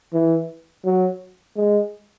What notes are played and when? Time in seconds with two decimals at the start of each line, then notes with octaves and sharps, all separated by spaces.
0.13 E3
0.85 F#3
1.56 G#3